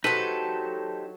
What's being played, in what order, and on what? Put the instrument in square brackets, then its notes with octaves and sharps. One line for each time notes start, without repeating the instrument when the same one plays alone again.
[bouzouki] F#3 A4 [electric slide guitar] D#4 G4 C5 [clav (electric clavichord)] B4